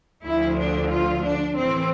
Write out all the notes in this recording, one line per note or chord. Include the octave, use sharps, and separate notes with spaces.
D2 D3 F3 E4
D4
F4
D4
A2 E3 C4